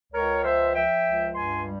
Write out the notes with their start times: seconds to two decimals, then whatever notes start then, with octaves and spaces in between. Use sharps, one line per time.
0.13 C#2 A#4 C#5
0.43 F3 C5 E5
0.74 F3 E5 G5
1.04 C#2
1.34 G2 G#5 C6
1.65 G3